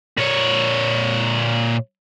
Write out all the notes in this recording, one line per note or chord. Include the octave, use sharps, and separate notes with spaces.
A#2 C#5